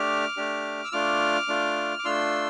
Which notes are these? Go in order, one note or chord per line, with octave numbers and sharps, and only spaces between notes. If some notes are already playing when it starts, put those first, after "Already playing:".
Already playing: A3 D4 G4 D6 F6
A3 D4 G4
E6
A3 D4 F4 D6 F6
A3 D4 F4
D6
A3 D4 F4 C6 E6